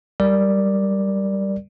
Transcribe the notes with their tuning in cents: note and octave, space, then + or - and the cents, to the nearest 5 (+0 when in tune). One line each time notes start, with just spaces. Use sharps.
G3 +0 A#4 +0 D5 +0